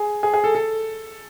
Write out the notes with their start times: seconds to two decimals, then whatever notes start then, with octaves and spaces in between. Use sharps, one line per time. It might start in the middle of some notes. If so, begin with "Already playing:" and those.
Already playing: G#4
0.23 G#4
0.34 G#4
0.44 A4
0.55 A4